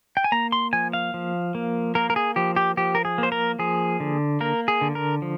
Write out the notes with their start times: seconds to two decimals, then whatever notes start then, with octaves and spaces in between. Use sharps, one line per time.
0.17 G5
0.24 G#5
0.32 A#3 A#5
0.52 C6
0.73 F3 G#5
0.93 F5
1.14 F3
1.55 A#3
1.95 A#3 A#4
2.10 A#4
2.16 G#4
2.36 F3 G4
2.56 G4
2.77 F3 G4
2.95 A#4
3.05 G#4
3.18 A#3 C5
3.32 A#4
3.59 F3 G#4
4.00 D3
4.40 A#3 A#4
4.68 G#4
4.81 D3
4.95 A#4
5.22 F3